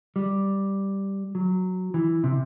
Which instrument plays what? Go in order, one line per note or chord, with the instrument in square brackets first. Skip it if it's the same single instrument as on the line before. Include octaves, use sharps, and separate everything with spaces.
[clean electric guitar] G3
F#3
E3
C3